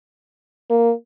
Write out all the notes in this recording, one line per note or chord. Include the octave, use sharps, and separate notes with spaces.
A#3